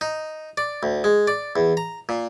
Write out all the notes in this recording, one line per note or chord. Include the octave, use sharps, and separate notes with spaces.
D#4
D5
D2
G#3
D5
E2
A#5
A#2